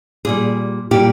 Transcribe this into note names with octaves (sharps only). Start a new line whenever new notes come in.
A#2 G3 G#4
A#2 G3 G4